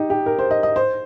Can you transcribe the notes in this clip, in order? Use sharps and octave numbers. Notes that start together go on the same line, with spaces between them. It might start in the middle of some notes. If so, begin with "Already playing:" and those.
Already playing: D#4 G4
G4
A#4
C5
D#5
D#5
C5